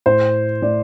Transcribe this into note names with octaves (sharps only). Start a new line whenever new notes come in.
A2 C5
A2 D5